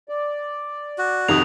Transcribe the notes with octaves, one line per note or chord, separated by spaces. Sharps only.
D5
F#4
F2 C3 D#3 D#6 F7